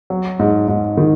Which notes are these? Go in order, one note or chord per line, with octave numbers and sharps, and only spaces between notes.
F#3
G#2
G#2
D#3